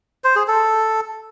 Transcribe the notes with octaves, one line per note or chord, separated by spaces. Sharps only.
C5
G#4
A4